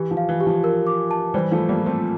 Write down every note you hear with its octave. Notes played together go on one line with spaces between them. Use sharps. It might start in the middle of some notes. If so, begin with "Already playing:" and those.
Already playing: E3 G4
F3
F5
E3
G4
F3
A#4
D6
A5
E3 G3 C5
F3 A3
F4
G3 A#3
F4
A3 C4